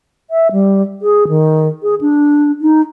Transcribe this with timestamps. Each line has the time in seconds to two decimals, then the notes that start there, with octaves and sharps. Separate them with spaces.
0.30 E5
0.52 G3
1.02 G#4
1.28 D#3
1.83 G#4
2.01 D4
2.62 D#4